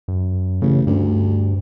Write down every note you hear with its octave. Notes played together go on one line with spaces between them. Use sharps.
F#2
A1 C#3
D2 G2